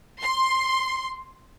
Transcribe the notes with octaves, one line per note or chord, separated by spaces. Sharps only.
C6